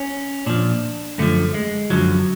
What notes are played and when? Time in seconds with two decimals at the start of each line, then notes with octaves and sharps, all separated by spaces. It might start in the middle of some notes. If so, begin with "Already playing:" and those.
Already playing: C#4
0.46 A#2 F3 D4
1.18 F#2 D3 F3 A3
1.54 G#3
1.90 F#2 D3 F3 F#3